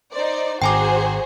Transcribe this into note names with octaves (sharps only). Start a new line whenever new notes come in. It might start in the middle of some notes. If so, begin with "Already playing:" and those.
D#4 C5 D5
G#1 F#4 G#4 C5 G5 G#5 A#5 D6